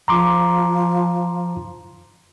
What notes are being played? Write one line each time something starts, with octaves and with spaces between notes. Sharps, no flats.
F3 A#5 C6 D6